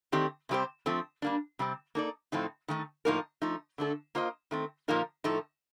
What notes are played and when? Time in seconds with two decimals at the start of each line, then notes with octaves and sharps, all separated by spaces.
0.12 D#3 A3 C4 G4 D5
0.49 C3 G3 C4 G4 C5
0.86 F3 A3 C4
1.22 G3 A#3 D4
1.59 C3 G3 C4
1.95 A#3 D#4 A4 D5
2.32 A2 F3 A3 C4 D#4
2.68 D#3 A3 D#4
3.05 A2 F3 A#3 D#4 A#4
3.42 F3 A3 D#4
3.78 D3 A3 D4 A4
4.15 A#3 F4 C5 D#5
4.51 D#3 A3 C4
4.88 A#2 F3 A#3 D#4 A#4
5.24 A2 F3 A3 D#4 A4